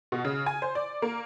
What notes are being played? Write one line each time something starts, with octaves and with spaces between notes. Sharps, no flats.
B2
C#3
G#5
C5
D5
A#3